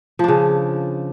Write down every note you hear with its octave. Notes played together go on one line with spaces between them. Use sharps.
C#3 F3 D4